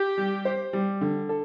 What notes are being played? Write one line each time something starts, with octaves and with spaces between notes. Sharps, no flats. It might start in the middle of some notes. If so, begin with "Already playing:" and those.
Already playing: G4
G3
C5
G3
D3
A4